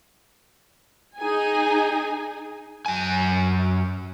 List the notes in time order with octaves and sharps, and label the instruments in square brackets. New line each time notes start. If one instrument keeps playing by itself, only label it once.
[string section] D#4 G#4 G#5
[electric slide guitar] F#2 G#5